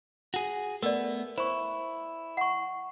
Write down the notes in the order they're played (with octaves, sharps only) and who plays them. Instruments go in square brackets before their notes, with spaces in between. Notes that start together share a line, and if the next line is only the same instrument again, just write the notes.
[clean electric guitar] F#4 G#4
[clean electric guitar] A3 B3 [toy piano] A#4 D5
[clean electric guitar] E4 [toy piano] C5 C#6
[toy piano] F#5 C#6